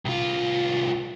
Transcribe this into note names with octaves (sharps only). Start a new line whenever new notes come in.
C2 F4